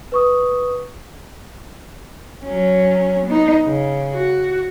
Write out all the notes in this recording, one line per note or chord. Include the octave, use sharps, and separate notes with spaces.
B4 C#6 D#6
F#3 C#4
B3 D#4
C#3
F#4